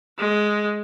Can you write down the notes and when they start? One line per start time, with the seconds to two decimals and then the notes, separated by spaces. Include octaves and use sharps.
0.19 G#3